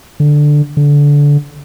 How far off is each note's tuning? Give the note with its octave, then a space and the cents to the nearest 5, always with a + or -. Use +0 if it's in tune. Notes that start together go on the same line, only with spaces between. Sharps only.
D3 +5
D3 -20